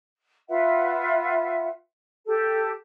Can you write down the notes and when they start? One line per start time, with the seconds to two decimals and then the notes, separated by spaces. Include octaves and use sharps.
0.48 F4 B4 E5 F#5
2.26 G4 A4